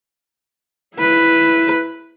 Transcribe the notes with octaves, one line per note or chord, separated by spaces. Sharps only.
E4 B4